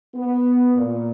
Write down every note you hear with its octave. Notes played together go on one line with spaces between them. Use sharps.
B3
A#2